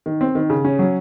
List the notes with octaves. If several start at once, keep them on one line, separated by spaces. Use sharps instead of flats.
D#3
C4
D#3
C#3
C#4
F#3